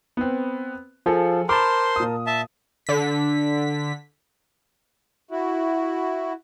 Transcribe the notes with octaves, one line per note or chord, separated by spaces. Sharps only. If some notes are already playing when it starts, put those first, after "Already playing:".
B3 C4
F3 F4 G#4 A4
A#4 C5 A5 B5 C6 D6
A#2 D#6
E5 A5
D3 B6
E4 F#4